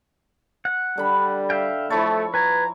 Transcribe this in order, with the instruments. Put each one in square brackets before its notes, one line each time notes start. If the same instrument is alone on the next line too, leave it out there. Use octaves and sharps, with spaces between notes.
[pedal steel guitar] F#5
[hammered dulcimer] D3 B5 [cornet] G3
[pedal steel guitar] E5 F5 G5
[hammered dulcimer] F3 E4 C#5 [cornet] A3 [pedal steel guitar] A4
[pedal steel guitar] B4 G#5 [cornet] A#5